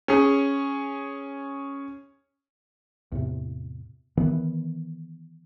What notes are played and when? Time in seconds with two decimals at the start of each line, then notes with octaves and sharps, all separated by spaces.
0.08 C#4 G#4
3.12 E2 A2 C3
4.17 D#3 E3 B3